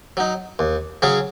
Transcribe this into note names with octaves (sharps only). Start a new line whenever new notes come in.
F#3 D#4
D#2
C#3 F#3 C#4 G#4